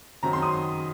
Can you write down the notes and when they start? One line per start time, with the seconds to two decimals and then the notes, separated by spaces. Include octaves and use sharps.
0.23 F#2 D#3 F#3 C4 A#5
0.33 C6
0.42 D#6